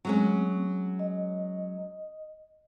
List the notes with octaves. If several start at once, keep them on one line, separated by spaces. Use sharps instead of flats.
F#3 G#3 A3 C4 C#4
D#5